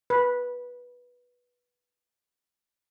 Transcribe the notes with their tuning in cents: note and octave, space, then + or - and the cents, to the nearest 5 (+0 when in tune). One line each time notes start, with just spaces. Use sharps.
B4 -10